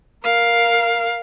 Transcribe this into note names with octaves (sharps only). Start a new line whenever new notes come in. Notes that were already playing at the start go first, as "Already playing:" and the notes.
A#4 F5